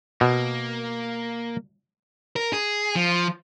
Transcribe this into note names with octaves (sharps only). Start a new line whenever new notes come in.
B2 A#3
A#4
G#4
F3